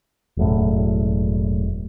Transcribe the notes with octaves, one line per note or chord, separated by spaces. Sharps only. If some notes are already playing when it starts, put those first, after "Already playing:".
E1 F#2 A2